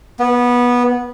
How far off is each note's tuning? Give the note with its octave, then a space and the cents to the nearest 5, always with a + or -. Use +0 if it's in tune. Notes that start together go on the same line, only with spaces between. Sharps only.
B3 -15